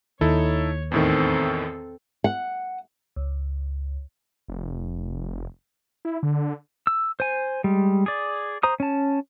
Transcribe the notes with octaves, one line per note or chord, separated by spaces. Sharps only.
D#2 D#4 E4 A4 C#5
E2 A2 D#3 C4 A4
F#5
C#2
F1
E4
D3
E6
C5 G#5
G3 G#3
G#4 D5
C5 A#5 D#6
C#4 A5